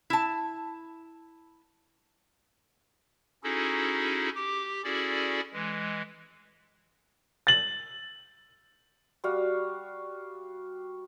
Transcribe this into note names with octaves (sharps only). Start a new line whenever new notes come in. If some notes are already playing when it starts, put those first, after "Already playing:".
E4 A5
C#4 D#4 E4 F#4 G#4 A4
G4 D6
C#4 E4 F#4 G#4 A4 D5
E3 G#3
A6 F#7
G3 F#4 F5